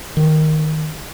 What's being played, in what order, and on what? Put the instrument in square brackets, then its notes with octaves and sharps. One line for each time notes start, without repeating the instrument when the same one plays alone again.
[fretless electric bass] D#3